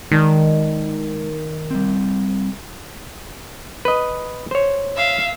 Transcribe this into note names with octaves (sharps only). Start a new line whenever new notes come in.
D#3 G#3 D5 A5
G3 C4
B4 D#5
C5 C#5
E5 F5